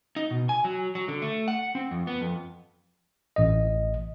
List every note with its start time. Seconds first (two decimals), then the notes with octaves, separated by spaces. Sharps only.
0.16 D#4
0.31 B2
0.49 G#5
0.64 F#3
0.95 F#3
1.08 D3
1.22 A3
1.48 F#5
1.75 C4
1.91 F2
2.07 B3
2.21 F2
3.36 A1 D#5